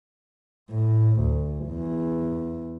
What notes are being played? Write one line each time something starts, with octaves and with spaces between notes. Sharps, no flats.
A2
D2
E2